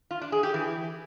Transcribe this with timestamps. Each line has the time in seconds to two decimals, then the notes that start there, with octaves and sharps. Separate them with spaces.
0.11 F4
0.21 D4
0.32 G#4
0.43 G4
0.54 E3